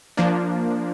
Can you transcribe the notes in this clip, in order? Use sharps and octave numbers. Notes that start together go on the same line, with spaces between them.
F3 A#3 D4